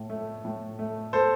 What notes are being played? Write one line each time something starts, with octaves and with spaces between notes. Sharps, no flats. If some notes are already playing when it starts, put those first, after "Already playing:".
Already playing: A2
A3
A2
A3
A4 C5